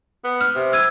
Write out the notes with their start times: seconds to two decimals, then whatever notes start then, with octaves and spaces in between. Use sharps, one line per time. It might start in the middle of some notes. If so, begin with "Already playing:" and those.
0.24 B3
0.41 F6
0.55 C3
0.73 E6 G#6 D#7